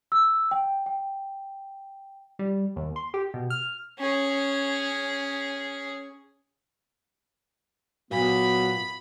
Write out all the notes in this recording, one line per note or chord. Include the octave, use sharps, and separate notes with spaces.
E6
G5
G5
G3
D#2
C6
G4
B2
F6
C#4 G#4
A#2 F#3 B3 B5